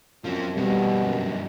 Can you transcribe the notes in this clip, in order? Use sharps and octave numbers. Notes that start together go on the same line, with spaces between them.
F#2 F3 C4
G2 B2 G3 A#3
F#2